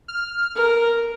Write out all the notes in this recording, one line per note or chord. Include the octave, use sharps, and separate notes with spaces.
F6
A#4